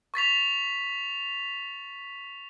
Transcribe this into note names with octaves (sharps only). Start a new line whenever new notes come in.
C#6 A6 B6 F7